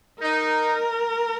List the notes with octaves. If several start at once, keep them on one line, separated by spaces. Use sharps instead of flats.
D#4 A#4